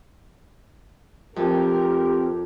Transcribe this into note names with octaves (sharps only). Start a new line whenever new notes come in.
F2 C4 G4 A#4